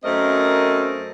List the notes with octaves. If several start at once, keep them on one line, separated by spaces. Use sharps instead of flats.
F#2 A3 C4 A#4 D#5